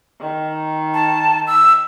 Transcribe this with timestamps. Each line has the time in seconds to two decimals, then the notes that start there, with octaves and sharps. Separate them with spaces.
0.20 D#3
0.94 A5
1.47 E6